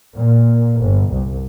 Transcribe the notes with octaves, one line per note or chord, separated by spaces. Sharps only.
A#2
G1
C2